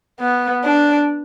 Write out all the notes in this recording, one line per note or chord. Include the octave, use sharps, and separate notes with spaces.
B3
D4